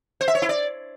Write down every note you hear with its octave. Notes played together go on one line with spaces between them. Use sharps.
C5
E5
C#5
E4
D5